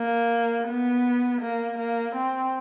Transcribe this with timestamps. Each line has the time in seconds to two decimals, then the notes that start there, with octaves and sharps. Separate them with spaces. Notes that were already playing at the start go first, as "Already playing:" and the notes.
Already playing: A#3
0.68 B3
1.42 A#3
1.78 A#3
2.16 C4